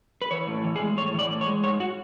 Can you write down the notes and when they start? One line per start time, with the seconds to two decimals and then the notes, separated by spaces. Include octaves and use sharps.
0.22 B4
0.31 E3 C#5
0.47 A2
0.64 E3
0.76 G#4
0.81 G#3
0.97 A2 C#5
1.14 E3 D5
1.30 A2
1.41 C#5
1.46 G#3
1.63 G#2 C#5
1.80 F#4